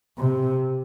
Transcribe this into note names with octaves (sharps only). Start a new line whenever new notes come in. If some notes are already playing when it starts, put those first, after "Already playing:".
C3